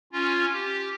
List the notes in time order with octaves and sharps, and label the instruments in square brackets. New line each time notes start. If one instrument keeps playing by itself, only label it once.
[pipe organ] C#4 F4
G4